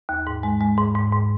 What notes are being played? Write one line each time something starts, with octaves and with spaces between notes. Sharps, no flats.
D#2
G#2
G#3
G#3
G#2
G#2
G#2